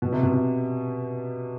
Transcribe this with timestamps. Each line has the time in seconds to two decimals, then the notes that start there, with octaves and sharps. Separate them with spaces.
0.02 B2
0.12 C3
0.23 B2
0.34 C3